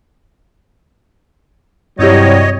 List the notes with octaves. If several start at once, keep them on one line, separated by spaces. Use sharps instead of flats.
G2 C3 F#3 G3 E4 G4 C#5 D#5